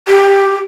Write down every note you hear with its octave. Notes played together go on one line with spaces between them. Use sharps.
G4